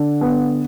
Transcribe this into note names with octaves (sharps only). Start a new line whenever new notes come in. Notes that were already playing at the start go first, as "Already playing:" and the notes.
Already playing: D3
B3